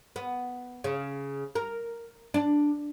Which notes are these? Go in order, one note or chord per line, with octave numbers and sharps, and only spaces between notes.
B3
C#3
A#4
D4